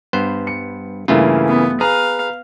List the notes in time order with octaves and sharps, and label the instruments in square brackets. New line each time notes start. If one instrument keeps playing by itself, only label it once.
[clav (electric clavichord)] G2 B3 C5
[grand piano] C#7
[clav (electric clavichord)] G2 A3 F4 [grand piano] C#3 E3 A#3
[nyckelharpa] B3
[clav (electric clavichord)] G#4 [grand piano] B4 A#5 [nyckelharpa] F5